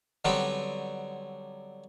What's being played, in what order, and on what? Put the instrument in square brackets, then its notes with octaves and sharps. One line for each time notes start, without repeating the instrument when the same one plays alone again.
[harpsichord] D3 F#3 G3 B3 C4 B4